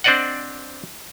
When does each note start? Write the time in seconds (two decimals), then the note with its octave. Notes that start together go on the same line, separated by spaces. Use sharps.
0.04 C4 D4 C5 D5 D#5 F#5